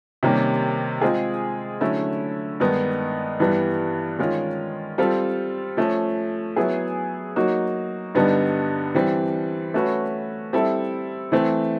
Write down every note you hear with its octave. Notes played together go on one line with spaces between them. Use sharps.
C3 D#3 G3 A#3 C#4
G#3 C4 F4 G#4
D3 F#3 A3 C#4 E4
G2 D#3 G#3 B3 D#4
G2 E3 G3 B3
D#3 G#3 C#4 F4
G3 C4 F4 A4
F3 A3 C#4
F#3 B3 E4 G#4
F#3 A#3 D#4 F#4
G2 D3 G3 B3 D#4
E3 G3 C4
A3 C#4 F#4 B4
G3 C4 E4 A4
E3 A3 C4